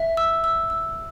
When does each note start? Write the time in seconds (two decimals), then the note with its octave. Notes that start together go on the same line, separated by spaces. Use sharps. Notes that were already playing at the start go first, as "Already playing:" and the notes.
Already playing: E5
0.17 E6
0.44 E6
0.70 E6